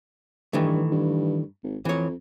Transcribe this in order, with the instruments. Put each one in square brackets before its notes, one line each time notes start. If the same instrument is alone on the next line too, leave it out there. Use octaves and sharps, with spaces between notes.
[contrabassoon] G2 [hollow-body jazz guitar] D#3 E3 A3
[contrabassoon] G2
G#1
[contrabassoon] F2 [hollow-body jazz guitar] E3 C#5